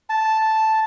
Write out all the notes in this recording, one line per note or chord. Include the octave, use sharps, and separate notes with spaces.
A5